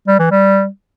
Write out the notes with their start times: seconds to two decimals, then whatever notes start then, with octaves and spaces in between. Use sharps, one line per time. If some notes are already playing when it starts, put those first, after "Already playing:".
0.07 G3
0.19 E3
0.31 G3